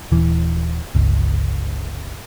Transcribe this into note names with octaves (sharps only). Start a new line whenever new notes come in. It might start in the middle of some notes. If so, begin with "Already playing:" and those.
D#1 E3
G1 C#2